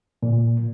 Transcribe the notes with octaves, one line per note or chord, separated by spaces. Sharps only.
A#2